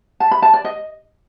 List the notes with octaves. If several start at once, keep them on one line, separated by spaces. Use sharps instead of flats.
A5
B5
A5
D5
D#5